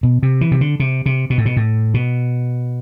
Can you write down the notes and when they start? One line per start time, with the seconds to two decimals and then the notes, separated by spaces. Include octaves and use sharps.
0.03 B2
0.23 C3
0.41 E3
0.51 C3
0.61 D3
0.80 C3
1.06 C3
1.30 B2
1.38 A2
1.46 B2
1.57 A2
1.94 B2